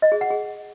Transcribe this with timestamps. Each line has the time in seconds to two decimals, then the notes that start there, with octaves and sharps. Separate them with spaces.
0.02 D#5
0.12 G#4
0.21 F#5
0.30 G#4